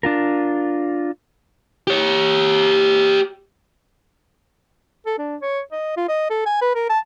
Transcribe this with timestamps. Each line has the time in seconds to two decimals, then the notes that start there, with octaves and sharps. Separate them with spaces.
0.03 D4 F4 A#4
1.87 G4 C#5
5.06 A4
5.18 D4
5.42 C#5
5.72 D#5
5.97 F4
6.09 D#5
6.30 A4
6.46 G#5
6.61 B4
6.75 A#4
6.89 A5